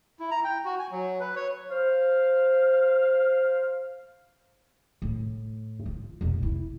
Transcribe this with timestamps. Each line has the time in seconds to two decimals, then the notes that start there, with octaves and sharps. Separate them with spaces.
0.20 E4
0.31 A#5
0.44 G5
0.65 F#4
0.79 G#5
0.91 F#3
1.20 B4
1.36 C#5
1.70 C5 F5
5.02 A2
5.86 F4
6.21 F1 B2
6.39 D#4 E4